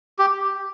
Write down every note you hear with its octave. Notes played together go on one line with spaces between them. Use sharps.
G4